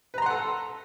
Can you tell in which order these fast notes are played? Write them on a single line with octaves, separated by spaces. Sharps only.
B4 A#5 C6 F#5 A4